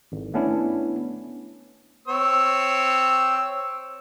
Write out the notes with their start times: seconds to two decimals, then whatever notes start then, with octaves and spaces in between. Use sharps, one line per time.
0.12 G#1
0.34 A3 B3 C#4 D4 E4
2.08 C4 C#5 E6